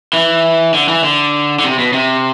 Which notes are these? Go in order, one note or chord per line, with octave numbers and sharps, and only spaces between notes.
E3
D3
E3
D3
D3
C3
B2
C3